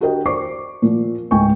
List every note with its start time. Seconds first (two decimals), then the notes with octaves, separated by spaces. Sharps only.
0.01 D4 F#4 G4 A#4 D#5 G5
0.26 C5 D5 C#6 D6 C7
0.82 A#2 F3
1.31 C#2 G#2 G5 G#5 C#6